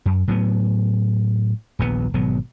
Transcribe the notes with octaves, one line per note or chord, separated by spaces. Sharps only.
F#2
A2 F#3 B3
D#1 A#1 A#2 B3
G#1 B2 F#3 B3